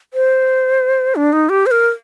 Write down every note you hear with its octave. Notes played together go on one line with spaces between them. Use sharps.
C5
D4
D#4
G4
C5
A#4